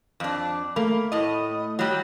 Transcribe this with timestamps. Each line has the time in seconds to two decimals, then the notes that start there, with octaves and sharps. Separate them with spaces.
0.20 F2 D4
0.76 A3 A#3 B5
1.12 A2 D#5
1.79 F#3 G3